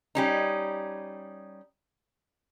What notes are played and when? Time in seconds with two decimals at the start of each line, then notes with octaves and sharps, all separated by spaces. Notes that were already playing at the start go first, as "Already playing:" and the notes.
0.15 G3 C#4 D#4